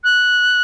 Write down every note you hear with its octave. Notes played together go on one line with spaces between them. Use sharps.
F#6